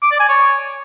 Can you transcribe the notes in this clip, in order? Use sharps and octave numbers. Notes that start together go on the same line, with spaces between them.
D6
D5
G#5
C#5